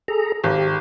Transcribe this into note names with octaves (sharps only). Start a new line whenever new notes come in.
G#4 A4 A#5
G#1 G4